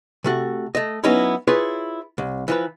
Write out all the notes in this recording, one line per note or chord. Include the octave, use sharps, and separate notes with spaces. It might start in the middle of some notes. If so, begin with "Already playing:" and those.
C3 A3 F#4
A3 D#5
F#3 B3 C#4 D#4 E4
E4 F4 G#4 B4 C#5
C2
E3 F3 B4